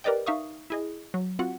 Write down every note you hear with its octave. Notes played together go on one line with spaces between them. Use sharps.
G4 A#4 B4 D5 D#5 G5
D#4 E5 F5 C#6 D#6
E4 G#4 D#5
F#3
C4 F4 F#4 F#5